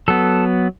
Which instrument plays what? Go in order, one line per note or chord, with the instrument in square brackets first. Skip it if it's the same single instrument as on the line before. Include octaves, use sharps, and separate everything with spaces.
[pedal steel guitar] F#3 B3 A4